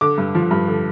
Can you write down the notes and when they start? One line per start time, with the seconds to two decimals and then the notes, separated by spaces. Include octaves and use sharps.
0.01 D3 D6
0.18 G2
0.35 F3
0.51 G2
0.68 D3